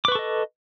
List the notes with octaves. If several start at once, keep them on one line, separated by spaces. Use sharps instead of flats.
A4 B4 D#5 C#6 D6